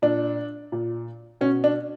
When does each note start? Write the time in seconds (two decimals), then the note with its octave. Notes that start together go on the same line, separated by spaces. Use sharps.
0.02 A#2 D4
0.72 A#2
1.41 B2 C#4
1.64 D4